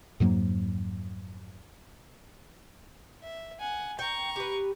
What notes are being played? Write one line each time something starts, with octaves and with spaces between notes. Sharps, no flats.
F2 G#2 F#3 A#3
E5
F#5 G#5
G5 A#5 C#6
G4 B4